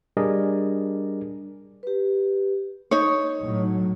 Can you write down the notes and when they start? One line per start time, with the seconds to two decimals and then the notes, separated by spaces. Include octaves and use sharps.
0.17 G3 D4 G#4 A#4 D5 D#5
1.83 G4 B4
2.91 D#4 C#5
3.42 A2 F#3